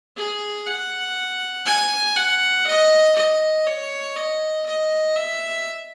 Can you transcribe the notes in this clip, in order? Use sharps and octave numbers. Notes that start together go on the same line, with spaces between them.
G#4
F#5
G#5
F#5
D#5
D#5
C#5
D#5
D#5
E5